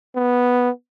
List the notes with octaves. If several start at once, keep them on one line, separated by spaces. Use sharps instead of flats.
B3